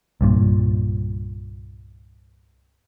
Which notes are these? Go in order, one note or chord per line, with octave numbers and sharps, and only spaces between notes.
C2 G2 A#2